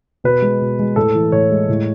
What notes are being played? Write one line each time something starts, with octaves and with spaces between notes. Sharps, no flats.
B2 B4
G#3
B2
G#3
A2 A4
E3
A2 C#5
G#3
A2